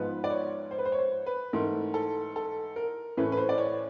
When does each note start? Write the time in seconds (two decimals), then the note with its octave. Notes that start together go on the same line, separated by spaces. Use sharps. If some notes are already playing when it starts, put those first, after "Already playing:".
Already playing: G#2 F3 G#3 B3 B4
0.24 D5
0.30 C#5
0.71 C5
0.78 B4
0.85 C5
0.92 C#5
0.99 C5
1.26 B4
1.53 G#2 E3 A3 A#4
1.94 A4
2.36 A4
2.76 A#4
3.17 A2 E3 A3 C#4 B4
3.32 B4
3.37 C5
3.49 D5
3.58 C#5